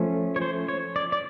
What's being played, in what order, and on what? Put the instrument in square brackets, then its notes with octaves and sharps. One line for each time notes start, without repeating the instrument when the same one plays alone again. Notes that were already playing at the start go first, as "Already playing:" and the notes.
Already playing: [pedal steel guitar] F3 A3 C#4
C#5
C5
C#5
D5
D5